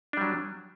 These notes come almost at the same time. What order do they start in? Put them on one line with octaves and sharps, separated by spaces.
D4 G3 F#3